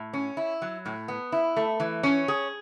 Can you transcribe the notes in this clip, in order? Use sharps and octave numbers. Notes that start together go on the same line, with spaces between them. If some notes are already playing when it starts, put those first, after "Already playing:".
Already playing: A2
C#4
E4
F#3
A2
B3
E4
A3
E3
C#4
G#4